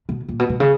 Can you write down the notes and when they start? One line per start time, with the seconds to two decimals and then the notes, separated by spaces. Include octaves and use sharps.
0.09 B2
0.29 A#2
0.39 B2
0.49 B2
0.60 C#3